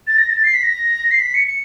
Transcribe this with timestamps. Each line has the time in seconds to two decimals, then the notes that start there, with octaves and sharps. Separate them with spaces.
0.07 A6
0.18 A#6
0.30 A6
0.44 C7
0.54 B6
0.63 A#6
1.11 C7
1.19 B6
1.34 C#7
1.47 C#7